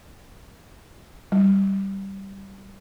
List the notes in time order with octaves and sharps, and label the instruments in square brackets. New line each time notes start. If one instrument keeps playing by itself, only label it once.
[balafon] G3